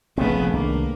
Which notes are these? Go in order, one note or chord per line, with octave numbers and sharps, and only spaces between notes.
F1 A#1 C#3 A3 B3 C4
C2 D#3 A#3 D4